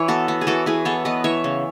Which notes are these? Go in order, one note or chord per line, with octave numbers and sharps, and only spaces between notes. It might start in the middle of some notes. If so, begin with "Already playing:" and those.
Already playing: E3 C#5
B3 F#4 A4
B3
G#4
E3 F#4 A4
E3 G#4 B4
B3 A4 C#5
B3 B4 D#5
E3 C#5 E5
C#3